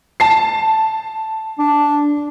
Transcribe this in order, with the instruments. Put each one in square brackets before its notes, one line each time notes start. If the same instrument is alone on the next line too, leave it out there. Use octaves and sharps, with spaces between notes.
[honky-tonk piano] A5 C7
[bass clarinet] D4